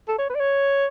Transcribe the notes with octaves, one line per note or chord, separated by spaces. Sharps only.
A4
C#5
B4
D5
C#5